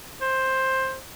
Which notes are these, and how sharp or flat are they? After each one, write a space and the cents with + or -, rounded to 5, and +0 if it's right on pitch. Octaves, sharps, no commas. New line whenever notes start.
C5 +10